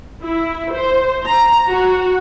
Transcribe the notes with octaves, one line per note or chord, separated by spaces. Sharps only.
E4
C5
A#5
F#4